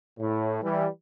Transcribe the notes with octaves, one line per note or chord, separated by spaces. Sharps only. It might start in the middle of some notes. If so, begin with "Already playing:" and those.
A2
E3 G3